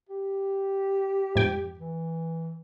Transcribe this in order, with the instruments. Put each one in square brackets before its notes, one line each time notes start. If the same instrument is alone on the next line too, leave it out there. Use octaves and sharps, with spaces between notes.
[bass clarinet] G4
[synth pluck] F2 G#2 G5
[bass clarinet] E3